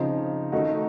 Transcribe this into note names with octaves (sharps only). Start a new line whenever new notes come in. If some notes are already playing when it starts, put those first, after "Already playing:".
Already playing: C#3 F3 C4 D#4
D#3 A3 D#4 F#4